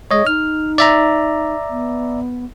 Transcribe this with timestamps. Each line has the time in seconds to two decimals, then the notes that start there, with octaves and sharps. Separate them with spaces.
0.11 G#3 C#5 D#5
0.27 D#4 F6
0.78 D5 E5 A#5
1.70 B3